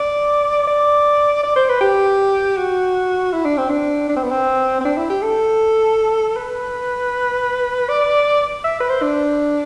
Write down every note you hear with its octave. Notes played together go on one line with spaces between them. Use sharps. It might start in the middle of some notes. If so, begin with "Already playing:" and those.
Already playing: D5
D5
D5
C5
B4
G4
F#4
E4
D4
C4
D4
D4
C4
B3
C4
C4
D4
E4
G4
A4
B4
D5
E5
B4
C5
D4